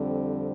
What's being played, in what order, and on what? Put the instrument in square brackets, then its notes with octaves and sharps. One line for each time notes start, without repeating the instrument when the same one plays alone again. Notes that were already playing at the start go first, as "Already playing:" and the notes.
Already playing: [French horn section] F2 D3 G3 C4